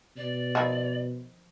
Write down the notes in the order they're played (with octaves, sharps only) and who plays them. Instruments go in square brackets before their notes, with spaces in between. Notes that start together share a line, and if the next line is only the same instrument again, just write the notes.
[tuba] B2 [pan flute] D5
[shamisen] D#3 F3 E4